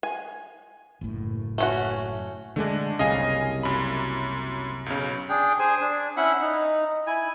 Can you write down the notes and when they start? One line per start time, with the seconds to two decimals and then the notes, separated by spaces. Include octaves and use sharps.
0.03 G#5
1.01 F#1 A2
1.58 A3 C#4 F#4
2.56 D3 G#3 A3 D4
2.99 F#1 C2 C#3 D#5 F5 G#5
3.63 F#2 B5
4.86 B1 C#3
5.29 D4 G#4 G5
5.59 G#4 C5 G#5
5.81 D4
6.17 C#4 E4 E5 F#5
6.41 D#4
7.07 E4 G#5